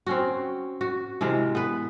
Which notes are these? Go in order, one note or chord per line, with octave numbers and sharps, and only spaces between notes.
C4 C#4 F#4
F#4
C3 E3 G#3 A#4
B3 B4